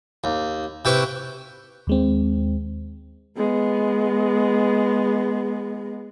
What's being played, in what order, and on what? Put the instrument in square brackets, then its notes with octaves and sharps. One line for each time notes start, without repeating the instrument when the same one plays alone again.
[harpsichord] D#2
C3 E4 B4 G5 C#6
[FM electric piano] D#2 G#3 C4
[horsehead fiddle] G#3 B3